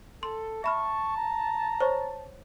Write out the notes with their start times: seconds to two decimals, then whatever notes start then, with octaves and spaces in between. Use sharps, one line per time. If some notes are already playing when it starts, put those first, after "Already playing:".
0.23 A4 C6
0.64 E5 A5 B5 C#6 F6
1.17 A#5
1.80 C5 C#5 C#6